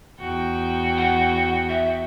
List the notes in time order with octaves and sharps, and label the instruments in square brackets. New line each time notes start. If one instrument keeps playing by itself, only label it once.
[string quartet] E2 F#4 G5
[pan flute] F#5
E5